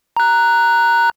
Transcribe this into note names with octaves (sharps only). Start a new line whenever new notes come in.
A#5 F#6